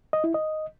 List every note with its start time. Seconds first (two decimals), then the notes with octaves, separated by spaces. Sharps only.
0.13 D#5
0.24 E4
0.34 D#5